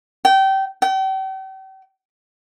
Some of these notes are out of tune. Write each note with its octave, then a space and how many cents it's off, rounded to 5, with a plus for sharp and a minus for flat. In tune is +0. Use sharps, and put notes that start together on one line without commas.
G5 -25
G5 -40